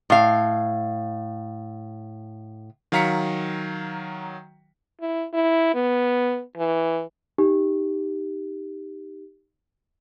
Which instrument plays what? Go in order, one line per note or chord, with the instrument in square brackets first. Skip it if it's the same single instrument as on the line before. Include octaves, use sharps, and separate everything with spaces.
[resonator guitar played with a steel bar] A2 F5
[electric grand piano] D#3 F#3 F5 A#5 B6 C#7
[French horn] E4
E4
B3
E3
[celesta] D#4 G4